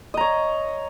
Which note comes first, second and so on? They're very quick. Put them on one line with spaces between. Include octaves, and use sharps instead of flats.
D#5 A#5 C#5